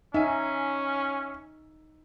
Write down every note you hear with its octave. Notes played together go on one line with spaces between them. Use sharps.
C#4 D#4 E5 G#5